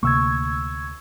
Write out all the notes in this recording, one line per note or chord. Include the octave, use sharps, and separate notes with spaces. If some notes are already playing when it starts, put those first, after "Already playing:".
D2 C3 A#3 C#6 E6 G#6